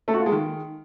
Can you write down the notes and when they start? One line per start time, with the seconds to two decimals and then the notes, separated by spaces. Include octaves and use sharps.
0.08 A3
0.14 F#4
0.20 F4
0.26 G#3
0.32 D#3